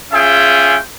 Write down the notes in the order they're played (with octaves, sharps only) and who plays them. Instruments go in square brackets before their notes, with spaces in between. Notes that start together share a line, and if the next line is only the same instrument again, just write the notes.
[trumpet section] C#4 F4 G#4 E5 G5